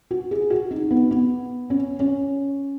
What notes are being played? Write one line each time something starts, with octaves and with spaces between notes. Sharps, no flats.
F#4
G#4
F#4
D#4
B3
B3
C#4
C#4